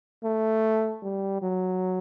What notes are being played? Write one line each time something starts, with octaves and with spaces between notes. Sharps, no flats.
A3
G3
F#3